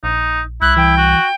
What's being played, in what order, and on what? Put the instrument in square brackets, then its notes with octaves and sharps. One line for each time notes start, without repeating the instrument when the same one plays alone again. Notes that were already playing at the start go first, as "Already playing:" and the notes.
[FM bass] A#1 [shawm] D#4
[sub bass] C2 [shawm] E4 [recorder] F#6
[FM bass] E3 [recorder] G5
[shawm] F#4